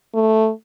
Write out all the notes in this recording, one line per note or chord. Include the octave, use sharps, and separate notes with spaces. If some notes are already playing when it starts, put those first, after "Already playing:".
A3